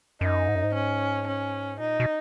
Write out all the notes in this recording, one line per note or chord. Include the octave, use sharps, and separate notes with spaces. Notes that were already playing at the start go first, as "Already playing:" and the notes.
F#2 D#4
G#2
F#2
G#2
C#4
C#4
A#2 D#4
B2